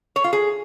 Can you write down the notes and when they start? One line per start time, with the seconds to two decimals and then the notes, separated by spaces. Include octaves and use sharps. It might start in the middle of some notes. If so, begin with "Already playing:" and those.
0.16 C#5
0.24 F4
0.33 G#4